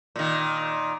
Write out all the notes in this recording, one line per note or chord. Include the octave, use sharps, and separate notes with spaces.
A#2 D#3